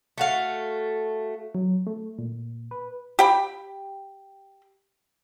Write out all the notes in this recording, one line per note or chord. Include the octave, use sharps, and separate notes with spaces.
A3 F#4 F5
F#3
A3
A#2
B4
G4 G5 B5